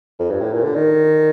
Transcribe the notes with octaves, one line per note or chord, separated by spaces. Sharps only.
F2
G2
A2
A#2
D3
D#3